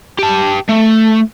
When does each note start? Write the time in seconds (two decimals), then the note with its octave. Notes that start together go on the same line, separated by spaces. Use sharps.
0.19 G4 A5
0.69 A3